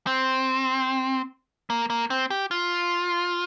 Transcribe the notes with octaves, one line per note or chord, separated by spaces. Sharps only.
C4
A#3
A#3
C4
G4
F4